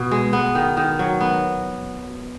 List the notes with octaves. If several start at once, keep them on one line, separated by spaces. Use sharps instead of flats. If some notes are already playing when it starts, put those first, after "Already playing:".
Already playing: B2
G#3
B3
D#3
D#3
F#3
B3